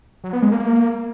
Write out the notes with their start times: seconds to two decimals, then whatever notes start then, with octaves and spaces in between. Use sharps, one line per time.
0.24 F#3
0.33 B3
0.42 G#3
0.52 A#3